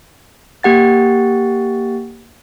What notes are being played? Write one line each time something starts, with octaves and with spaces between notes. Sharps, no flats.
A#3 G4 F#5 A6